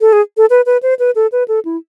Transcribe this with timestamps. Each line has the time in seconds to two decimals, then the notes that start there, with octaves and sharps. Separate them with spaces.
0.01 A4
0.13 G#4
0.37 A4
0.50 B4
0.66 B4
0.83 C5
0.99 B4
1.15 A4
1.32 B4
1.48 A4
1.65 E4